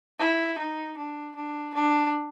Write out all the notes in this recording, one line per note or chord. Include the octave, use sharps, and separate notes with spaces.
E4
D#4
D4
D4
D4